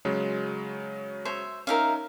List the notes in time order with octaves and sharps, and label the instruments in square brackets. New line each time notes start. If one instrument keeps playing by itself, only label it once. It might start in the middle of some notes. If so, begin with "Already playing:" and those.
[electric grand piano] C#3 F#3 G#3
[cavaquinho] C5 C#5 E5
[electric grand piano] C#4 D#4 [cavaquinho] A#4 E5 F5